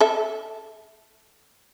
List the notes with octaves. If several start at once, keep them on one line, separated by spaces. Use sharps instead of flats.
A4 E5